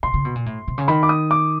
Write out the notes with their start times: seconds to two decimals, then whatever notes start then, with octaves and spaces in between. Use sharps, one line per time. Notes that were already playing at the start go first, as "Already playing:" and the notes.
0.03 C3 C6
0.14 C#3
0.25 B2
0.35 A#2
0.46 A2
0.68 C3
0.78 C#3
0.88 D#3 B5
1.03 D6
1.09 D#6
1.31 D6